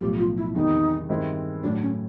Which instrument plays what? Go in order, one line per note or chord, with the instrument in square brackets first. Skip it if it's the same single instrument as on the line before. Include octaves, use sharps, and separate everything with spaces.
[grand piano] B1 A2 F3 [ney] G4
[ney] F4
E4
[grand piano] E2 C3 D#3 G3 [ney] D#4
[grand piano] G2 D#3 G#3 C4 E4
[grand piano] A2 F#3 A3 [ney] D4
[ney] C#4